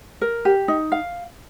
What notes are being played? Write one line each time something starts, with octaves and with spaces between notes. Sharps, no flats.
A#4
G4
D#4
F5